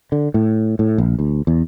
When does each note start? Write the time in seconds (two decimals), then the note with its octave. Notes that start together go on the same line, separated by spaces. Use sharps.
0.12 D3
0.34 A2
0.79 A2
0.98 A#1
1.19 D2
1.47 E2